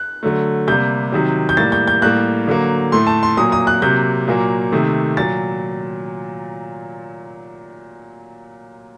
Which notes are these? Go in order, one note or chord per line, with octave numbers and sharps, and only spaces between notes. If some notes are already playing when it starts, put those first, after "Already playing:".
Already playing: F#6
D3 F#3 A3
C3 G3 A#3 G6
C3 D#3 F#3
G6
A2 G3 A#3 A6
G6
G6
A2 G3 A#3 F#6
D3 F#3 A#3
A2 A3 C6
A5
C6
A#2 F#3 A#3 D#6
D#6
F#6
C3 F#3 A#3 G6
A#2 F#3 A#3
C3 D#3 A3
A#2 F#3 A6